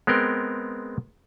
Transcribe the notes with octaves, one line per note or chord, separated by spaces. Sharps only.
G#3 B3 C4 A#4 G5